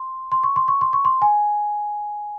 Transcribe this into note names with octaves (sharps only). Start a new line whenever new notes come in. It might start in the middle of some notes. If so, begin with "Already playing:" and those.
Already playing: C6
C6
C#6
C6
C#6
C6
C#6
C6
G#5